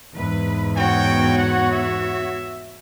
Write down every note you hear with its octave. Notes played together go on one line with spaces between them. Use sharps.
E2 G#2 B4
B3 F#4 C#5 G5
F#5
E5